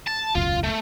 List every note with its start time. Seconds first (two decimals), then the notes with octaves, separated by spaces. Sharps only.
0.07 A5
0.35 E1 C#2 F#2 F4
0.64 A3